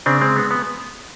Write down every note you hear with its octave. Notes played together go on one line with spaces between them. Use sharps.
C#3 C4 D4
G#3 C4
B3
B3